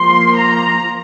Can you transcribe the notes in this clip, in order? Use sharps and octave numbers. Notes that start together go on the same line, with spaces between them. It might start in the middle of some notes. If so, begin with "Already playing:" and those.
Already playing: F3 A#3 C6
A#5